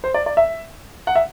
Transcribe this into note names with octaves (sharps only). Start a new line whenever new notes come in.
C5
D5
D5
E5
F#5
E5